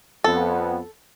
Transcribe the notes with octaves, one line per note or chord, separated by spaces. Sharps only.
F2 B3 A4